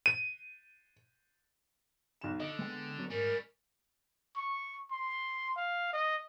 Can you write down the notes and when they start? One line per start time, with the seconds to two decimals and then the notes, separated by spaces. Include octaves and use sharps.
0.06 D#7
2.21 B1 E7
2.40 D3 D#5
2.59 G#3 B3 G5
2.98 F#3 B3 C#4
3.10 G#2 G3 C#4 A#4
4.36 C#6
4.91 C6
5.56 F5
5.93 D#5